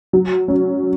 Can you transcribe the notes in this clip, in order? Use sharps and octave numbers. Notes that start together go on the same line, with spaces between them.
F#3
C#4